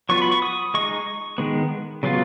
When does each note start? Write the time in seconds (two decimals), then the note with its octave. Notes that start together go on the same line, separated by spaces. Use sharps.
0.09 F#3 B3 F4 C#6
0.22 B5
0.31 C#6
0.42 D#6
0.74 G#3 D#4 C#6
1.38 D#3 G#3 B3
2.03 C#3 F#3 B3 F4